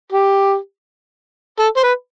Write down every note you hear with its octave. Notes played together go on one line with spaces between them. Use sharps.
G4
A4
C5
B4